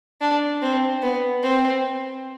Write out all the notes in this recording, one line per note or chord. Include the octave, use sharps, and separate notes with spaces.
D4
C4
B3
C4